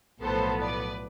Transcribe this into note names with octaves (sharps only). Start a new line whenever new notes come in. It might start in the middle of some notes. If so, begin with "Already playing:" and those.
B1 A2 F3 B3 A4 C5
B4 D5